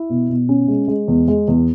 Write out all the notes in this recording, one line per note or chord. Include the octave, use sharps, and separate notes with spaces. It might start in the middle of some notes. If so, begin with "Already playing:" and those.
Already playing: E4
B2
B2
C#4
G#3
G#3
E2
G#3
E2